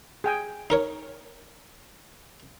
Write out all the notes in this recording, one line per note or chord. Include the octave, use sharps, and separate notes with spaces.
G#4 G5 G#5
D#4 A#4 C#5